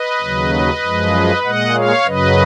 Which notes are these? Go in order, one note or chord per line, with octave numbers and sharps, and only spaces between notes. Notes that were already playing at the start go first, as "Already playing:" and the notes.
Already playing: B4 D#5
D#2 C#3 F#3
F#2 F3 G#3
A#2 G#3 D#5 F#5
C#5 F5
F#2 C#3 F#3 B4 D#5